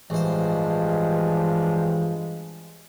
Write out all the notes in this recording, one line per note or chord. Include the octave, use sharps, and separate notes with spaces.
A1 G2 F3 G#3 C5